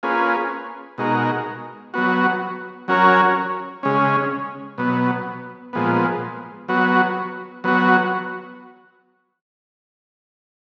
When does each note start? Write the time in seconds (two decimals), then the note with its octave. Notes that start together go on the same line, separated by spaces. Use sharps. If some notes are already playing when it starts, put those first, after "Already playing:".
0.03 A#3 C#4 F4 G#4 B4
0.98 B2 G#3 D#4 F#4 A#4
1.94 F#3 B3 F#4
2.88 F#3 C#4 F#4 A#4 C#5
3.83 C#3 G#3 C#4
4.78 B2 F#3 B3
5.73 A#2 F3 G#3 B3
6.68 F#3 B3 F#4
7.64 F#3 B3 F#4